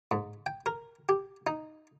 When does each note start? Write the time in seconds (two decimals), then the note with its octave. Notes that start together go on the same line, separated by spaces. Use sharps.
0.11 G#2
0.46 G5
0.66 A#4
1.09 G4
1.47 D#4